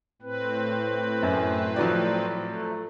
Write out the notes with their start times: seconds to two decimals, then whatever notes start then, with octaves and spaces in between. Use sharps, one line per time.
0.22 A2 C4 B4
1.23 F#2
1.76 F3 F#3 D5
2.32 A3